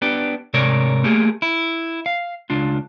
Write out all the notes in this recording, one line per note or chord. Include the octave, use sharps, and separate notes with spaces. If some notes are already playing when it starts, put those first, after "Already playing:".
B3 D4 G4
G#2 C3 A#4 C#5 D5
A3 A#3 G4 G#4
E4
F5
C#2 D4 F4